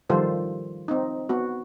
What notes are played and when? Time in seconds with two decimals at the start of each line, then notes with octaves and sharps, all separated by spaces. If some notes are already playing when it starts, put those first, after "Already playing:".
0.10 D#3 F3 G3 F4 A4 C5
0.88 C4 D#4
1.29 B3 F#4